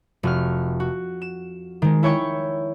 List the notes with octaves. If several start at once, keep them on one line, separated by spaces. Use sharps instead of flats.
F1 F#4 F6
F#4
E7
D#3 G#3
E4 C#5 G5 C#6